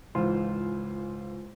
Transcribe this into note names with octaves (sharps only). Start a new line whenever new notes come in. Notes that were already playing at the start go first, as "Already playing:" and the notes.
C#2 G#2 E3 F4 C5 C6